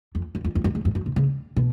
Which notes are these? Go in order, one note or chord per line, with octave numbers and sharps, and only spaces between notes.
F2
F#2
F2
F2
F#2
G#2
F#2
F#2
C3
C#3
B2